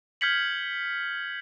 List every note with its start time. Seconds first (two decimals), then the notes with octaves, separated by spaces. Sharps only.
0.21 F6 G6 G#6 B6 C#7 F#7